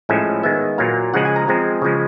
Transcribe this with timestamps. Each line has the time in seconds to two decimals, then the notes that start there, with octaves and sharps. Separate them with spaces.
0.09 A2 F3 G#3 C#4 E5
0.43 D#3 G#3 B3 E5
0.78 A#2 F#3 A#3 F5
1.14 C#3 F3 G#3 F#5
1.25 G#5
1.36 A#5
1.48 F3 G#3 C4
1.82 C#3 F3 G#3